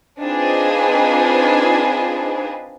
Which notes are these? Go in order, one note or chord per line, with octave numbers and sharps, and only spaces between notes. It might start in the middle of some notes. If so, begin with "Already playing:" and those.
C4 D4 D#4 F4 G#4 B4